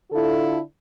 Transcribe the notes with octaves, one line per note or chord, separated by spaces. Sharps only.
D3 E4 F4 A4